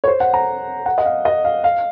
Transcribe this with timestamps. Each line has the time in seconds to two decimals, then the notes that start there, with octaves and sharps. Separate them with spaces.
0.04 C#5
0.08 C5
0.20 F#5
0.34 A#5
0.86 F#5
0.98 D#5
1.05 F5
1.25 D#5
1.44 F5
1.64 F5